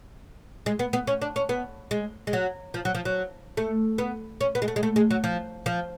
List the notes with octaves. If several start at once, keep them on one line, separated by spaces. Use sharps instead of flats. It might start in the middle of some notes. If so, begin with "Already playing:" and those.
G#3
B3
B3
C#4
D4
C#4
B3
G#3
G#3
F#3
F3
F#3
F3
F#3
A3
B3
C#4
B3
G#3
A3
G#3
A3
G#3
F#3
F3
F3